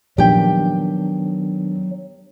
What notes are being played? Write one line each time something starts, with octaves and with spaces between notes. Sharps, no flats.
A#2 D#3 F3 F#3 B3 D4 G4 G5